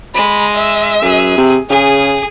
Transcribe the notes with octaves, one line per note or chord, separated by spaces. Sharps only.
G#3 B5
E5
F#2 G#4
C3
C#3 G#4 G#5